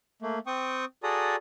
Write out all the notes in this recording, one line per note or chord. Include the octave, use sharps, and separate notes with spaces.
A3 A#3
C4 G5 C#6 D#6
F#4 G#4 A4 D5 A#5 D#6